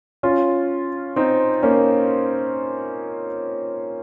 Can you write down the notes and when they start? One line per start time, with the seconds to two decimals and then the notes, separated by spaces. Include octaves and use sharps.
0.23 C#4 F4
1.16 C4 D#4
1.63 A#3 C#4